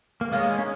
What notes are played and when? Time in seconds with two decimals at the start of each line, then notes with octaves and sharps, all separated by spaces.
0.21 A#3
0.32 D#3 G#3 A#3 C#4
0.58 C#4